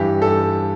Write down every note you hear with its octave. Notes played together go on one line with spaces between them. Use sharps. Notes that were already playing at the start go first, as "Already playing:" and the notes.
Already playing: G2 E3 G4
A4